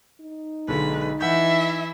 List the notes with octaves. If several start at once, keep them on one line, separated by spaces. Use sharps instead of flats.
D#4
B1 D3 G#3 B4
E3 E4 E5 F#5 G6